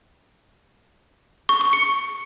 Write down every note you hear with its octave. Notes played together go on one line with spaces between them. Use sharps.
C#6
C#6
C#7